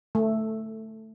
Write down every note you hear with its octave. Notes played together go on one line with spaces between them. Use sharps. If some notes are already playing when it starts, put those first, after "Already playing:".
A3